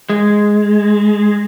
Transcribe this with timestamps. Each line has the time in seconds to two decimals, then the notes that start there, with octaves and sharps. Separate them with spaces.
0.10 G#3